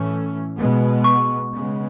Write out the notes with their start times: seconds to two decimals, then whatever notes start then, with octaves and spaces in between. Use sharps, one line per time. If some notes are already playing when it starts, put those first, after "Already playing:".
Already playing: A2 E3 A3 C#4
0.57 B2 G#3 B3
1.04 C#6
1.53 C#3 G#3 B3